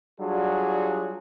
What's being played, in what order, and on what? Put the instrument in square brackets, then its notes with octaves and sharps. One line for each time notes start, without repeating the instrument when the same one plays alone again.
[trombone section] F#3 G3 D4 F4 F#4 G#4